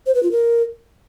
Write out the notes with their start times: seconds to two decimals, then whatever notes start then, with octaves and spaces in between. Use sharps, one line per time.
0.06 C5
0.15 B4
0.23 F4
0.31 A#4